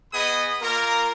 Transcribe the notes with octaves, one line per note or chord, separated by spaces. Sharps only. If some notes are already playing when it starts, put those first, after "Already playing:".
B3 G#4 D#5 B5 D#6
A#3 F4 A#4